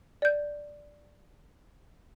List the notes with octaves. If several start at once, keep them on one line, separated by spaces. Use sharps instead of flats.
D5 G6